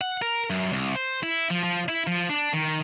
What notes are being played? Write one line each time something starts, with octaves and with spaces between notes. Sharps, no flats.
F#5
A#4
F#2
C2
C5
E4
F3
F3
E4
F3
D4
D#3